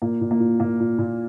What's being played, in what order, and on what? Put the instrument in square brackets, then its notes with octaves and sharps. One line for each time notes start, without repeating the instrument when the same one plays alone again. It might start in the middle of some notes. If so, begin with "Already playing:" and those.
[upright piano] A#2 A#3
A#2
A#3
A#2
A#2 A#3
A#2
A#2